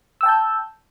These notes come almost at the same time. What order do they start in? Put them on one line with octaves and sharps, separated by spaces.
E6 G5 A5 G6